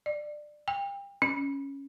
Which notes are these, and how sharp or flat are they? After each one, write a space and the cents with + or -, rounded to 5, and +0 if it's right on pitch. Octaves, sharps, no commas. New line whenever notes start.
D5 +20
G5 +30
C#4 +0